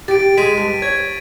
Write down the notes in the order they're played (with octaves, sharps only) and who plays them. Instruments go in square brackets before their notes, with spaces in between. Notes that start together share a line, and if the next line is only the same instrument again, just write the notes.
[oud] G4 [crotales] A6 D7
[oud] G#3 [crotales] B6 D#7
[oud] G2
[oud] C#5 [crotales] G#6